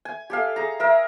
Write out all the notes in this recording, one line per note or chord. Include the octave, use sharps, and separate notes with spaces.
G#5
G4 A4 F5
G#4 A#5
A#4 E5